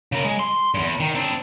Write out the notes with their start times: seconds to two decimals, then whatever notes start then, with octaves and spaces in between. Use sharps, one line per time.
0.12 C#3 A#4
0.25 G#3
0.39 C6
0.74 E2 G2
1.00 D#3
1.15 C4 D4